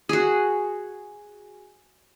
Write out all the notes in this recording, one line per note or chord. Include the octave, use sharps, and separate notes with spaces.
F#4 G#4